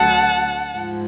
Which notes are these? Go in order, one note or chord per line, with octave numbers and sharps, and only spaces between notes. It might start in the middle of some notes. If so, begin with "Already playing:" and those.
Already playing: D2 D3 F#3 F#5 A5
G#2 F3